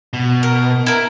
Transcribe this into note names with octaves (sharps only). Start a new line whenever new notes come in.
B2
A#4
E4 A#4